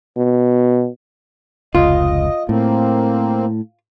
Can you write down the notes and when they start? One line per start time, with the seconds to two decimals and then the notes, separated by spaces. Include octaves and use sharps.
0.17 B2
1.75 F1 C#2 F4 D#5
2.49 A2 A#3 C4